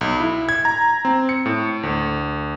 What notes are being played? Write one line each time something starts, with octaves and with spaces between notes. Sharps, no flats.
B1
E4
G#6
A#5
C4
C#7
A2
D2